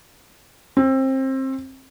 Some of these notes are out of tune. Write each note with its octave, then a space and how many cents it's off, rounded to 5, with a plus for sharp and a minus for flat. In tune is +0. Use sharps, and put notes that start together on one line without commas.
C4 +25